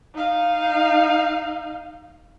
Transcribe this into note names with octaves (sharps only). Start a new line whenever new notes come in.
D#4 F5